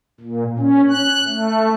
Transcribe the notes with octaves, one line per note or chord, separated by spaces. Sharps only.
A#2
C#4
F#6
A3